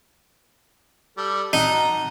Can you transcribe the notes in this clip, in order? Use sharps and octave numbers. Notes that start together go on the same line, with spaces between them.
G3 A4
D#4 F#4 A5 A#5